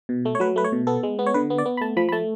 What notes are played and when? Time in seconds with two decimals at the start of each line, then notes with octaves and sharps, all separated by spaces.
0.09 B2
0.25 A3
0.35 C#5
0.40 F#3 B4
0.56 A3 B4
0.64 C#5
0.72 B2
0.87 B3 A4
1.03 G#3
1.19 B3
1.26 C#5
1.34 D3 B4
1.50 B3
1.58 D5
1.66 B3
1.77 B5
1.81 A3 A5
1.97 F3 B5
2.09 B5
2.12 A3 A5